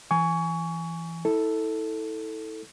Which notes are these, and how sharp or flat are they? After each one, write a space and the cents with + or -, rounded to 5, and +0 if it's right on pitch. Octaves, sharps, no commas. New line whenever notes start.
E3 +20 G#5 +0 C#6 +25
E4 -30 A4 +5